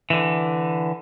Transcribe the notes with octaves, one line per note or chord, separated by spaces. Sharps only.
D3 E3